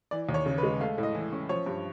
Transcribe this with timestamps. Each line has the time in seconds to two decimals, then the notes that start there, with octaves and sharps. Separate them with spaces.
0.11 E3 D5
0.29 D#2
0.34 C#5
0.46 C#3
0.58 B4
0.63 G#3
0.80 A3 F5
0.98 A2
1.03 D#5
1.15 E3
1.32 C#4
1.49 F3 C#5
1.66 G2